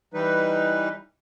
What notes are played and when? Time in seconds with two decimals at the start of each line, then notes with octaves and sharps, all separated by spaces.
0.14 E3 G3 D#4 B4